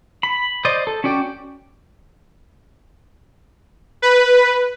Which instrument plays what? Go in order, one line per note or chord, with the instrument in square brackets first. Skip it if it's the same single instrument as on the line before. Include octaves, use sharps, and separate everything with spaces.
[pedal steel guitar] B5
C5 D5 D#5
A4
C#4 F#4 D5 G5
[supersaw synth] B4